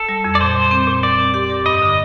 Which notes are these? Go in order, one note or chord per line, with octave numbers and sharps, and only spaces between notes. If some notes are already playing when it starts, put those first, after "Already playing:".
Already playing: A4
G3
F2
D5
A#2 C5
G3
C4
A#2
G3 D5
C4
G4
A#4
G2 D#5
D3